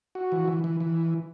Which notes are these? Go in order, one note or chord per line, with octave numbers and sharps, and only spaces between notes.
F#4
E3
E3
E3
E3